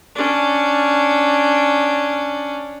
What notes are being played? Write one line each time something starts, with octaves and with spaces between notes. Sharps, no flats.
C#4 D4